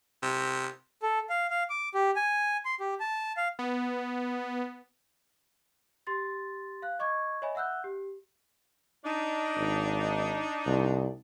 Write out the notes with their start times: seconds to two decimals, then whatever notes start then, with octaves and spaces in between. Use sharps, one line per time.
0.23 C3
1.02 A4
1.30 F5
1.50 F5
1.70 D6
1.94 G4
2.16 G#5
2.65 C6
2.80 G4
3.00 A5
3.37 F5
3.59 B3
6.07 G4 C6 A6
6.82 F5 F#6
6.99 D#5 C#6 D6 G#6
7.42 C#5 D#5 E5 G#5 B5
7.55 E5 F#5 E6 F#6 G6
7.84 G4
9.05 D4 D#4
9.57 G#1
10.67 C2